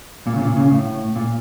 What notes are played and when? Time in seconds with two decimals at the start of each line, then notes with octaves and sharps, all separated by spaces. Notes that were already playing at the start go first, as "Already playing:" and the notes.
0.27 A#2
0.36 C#3
0.42 A#2
0.56 C#3
0.71 A2
1.16 A#2